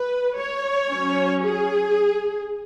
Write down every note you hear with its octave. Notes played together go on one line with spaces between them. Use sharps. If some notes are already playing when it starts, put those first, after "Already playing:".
Already playing: B4
C#5
F#3 C#4
G#4